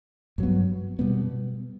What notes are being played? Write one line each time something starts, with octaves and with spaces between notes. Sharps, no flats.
G2 F#3 B3
B2 G3 B3